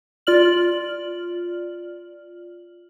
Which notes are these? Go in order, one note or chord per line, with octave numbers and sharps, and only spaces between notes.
F4 D5 F6 F#7